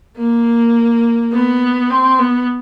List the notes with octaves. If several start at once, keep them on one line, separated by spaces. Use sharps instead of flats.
A#3
B3
C4
B3